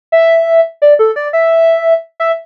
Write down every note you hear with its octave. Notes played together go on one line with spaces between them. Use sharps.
E5
D5
A4
D5
E5
E5